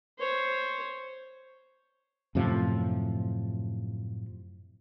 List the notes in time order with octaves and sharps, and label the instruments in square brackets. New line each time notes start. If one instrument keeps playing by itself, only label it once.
[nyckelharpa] C5 C#5
[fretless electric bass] F#2 A2 C3 F3